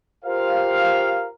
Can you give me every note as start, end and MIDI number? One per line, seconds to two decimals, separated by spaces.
0.25 1.29 65
0.25 1.29 67
0.25 1.29 70
0.25 1.29 72
0.25 1.29 77